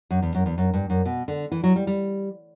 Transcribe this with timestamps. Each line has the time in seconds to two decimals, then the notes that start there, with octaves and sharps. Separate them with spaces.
0.10 F#2
0.22 E2
0.35 F#2
0.46 E2
0.58 F#2
0.74 G2
0.90 F#2
1.05 B2
1.28 D3
1.52 E3
1.64 F#3
1.76 G3
1.87 G3